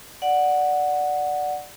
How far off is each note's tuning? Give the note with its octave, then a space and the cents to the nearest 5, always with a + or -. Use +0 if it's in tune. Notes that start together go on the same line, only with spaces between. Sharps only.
D5 +0 F#5 +0